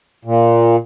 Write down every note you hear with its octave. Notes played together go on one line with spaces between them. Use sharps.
A#2